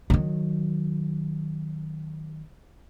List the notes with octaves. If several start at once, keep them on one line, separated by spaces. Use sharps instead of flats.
D#3 F#3